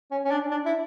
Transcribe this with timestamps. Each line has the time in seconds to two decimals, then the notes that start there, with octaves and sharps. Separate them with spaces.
0.11 C#4
0.25 C#4
0.31 D4
0.51 D4
0.66 E4